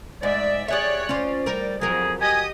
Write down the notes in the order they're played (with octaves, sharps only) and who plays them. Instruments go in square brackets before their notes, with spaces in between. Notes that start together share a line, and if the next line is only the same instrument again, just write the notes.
[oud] G#2 [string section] D5 E5
[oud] G4 G#4 E5 [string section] C#5 D5 F#6
[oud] C#4 F4 C5 [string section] D5
[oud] G3 A#4
[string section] F2 [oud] F#3 A#4 [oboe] G#4
[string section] G4 D#5 D#6 [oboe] G#5